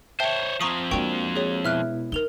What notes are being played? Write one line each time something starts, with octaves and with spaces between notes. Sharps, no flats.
C5 C#5 E5 G5 A5
F3 C4 A#5 C#6 D#6
G#3 A#3 D4 F#4 G5 C#6 F7
G#4 C#5
B2 B3 E4 E5 F6 F#6
D#4 A#4 F7 G7